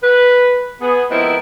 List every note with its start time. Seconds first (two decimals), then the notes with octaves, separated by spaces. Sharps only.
0.02 B4
0.81 B3 G#4
1.10 F3 G#3 B3 C4 E4 A#4